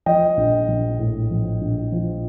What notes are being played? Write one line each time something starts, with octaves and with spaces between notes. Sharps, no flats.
F3 D#5 G5
A#1
A#1
A2
F3
A#1
F3